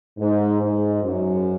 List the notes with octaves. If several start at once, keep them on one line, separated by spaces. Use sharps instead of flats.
G#2
G#2
F#2